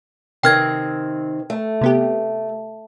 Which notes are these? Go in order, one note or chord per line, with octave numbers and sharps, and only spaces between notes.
C3 D#3 C4 G5 F6 G#6
A3
C3 B3 G4